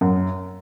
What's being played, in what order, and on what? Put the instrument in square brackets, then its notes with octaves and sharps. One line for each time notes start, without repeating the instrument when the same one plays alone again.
[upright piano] F#2